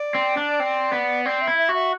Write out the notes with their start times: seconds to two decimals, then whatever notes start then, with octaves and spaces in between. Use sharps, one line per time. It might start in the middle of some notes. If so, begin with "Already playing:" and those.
Already playing: D5
0.15 C4
0.37 D4
0.60 C4
0.93 B3
1.25 C4 D5
1.42 E5
1.48 E4
1.58 E5
1.69 F#4
1.75 E5